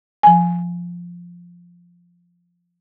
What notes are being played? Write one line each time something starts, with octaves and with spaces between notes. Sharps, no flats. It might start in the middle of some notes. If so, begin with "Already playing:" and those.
F3 G#5